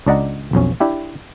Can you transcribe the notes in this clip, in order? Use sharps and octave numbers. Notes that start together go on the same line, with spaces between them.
C#2 D4 D5 D#5 F#5 A#5
B1 F2 C#4
D4 E4 G4